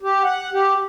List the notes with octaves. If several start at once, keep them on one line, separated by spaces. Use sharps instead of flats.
G4
F#5
G4